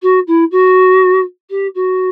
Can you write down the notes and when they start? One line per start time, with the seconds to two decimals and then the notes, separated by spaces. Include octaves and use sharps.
0.02 F#4
0.27 E4
0.51 F#4
1.50 G4
1.75 F#4